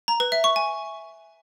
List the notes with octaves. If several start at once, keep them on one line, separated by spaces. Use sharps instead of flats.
A#5
B4
E5
C#6
G#5